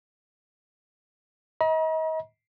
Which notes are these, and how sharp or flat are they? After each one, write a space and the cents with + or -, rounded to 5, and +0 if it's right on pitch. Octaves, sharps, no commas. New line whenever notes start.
D#5 +35 A#5 +45